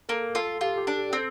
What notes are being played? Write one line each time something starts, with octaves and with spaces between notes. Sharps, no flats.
A#3 A4
F4 A4
F4 G4
G4
D4
A4
C4 A4